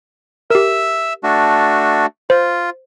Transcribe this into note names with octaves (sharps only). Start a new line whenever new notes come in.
G4 A#4 E5 E6
A3 D4 F#4
F4 C5